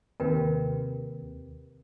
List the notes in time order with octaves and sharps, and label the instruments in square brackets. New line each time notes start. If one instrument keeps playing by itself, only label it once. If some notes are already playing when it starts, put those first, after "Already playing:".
[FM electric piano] D#2 C3 [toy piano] A#4 B4 G5